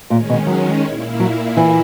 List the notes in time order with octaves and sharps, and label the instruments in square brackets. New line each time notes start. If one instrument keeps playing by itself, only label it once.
[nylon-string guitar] A#2 [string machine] D#3 G#3 C#4
[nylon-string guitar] B2
F#3
[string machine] A#2 A#3 E4
[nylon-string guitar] F#3
E3